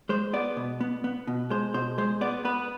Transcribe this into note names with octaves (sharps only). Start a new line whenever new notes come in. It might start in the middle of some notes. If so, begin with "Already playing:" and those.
G#3 C5
B3 D5
B2
B3
B3
B2
G#3 C5
B2 C5
G#3 C5
B3 D5
B3 B4